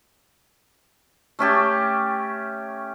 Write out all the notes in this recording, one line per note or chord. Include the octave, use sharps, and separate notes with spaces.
A3 C#4 G4 A5